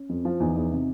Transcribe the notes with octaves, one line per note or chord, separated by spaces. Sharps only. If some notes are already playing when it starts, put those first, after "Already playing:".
Already playing: C#4
F2
F3
E2 D#4
E2
C3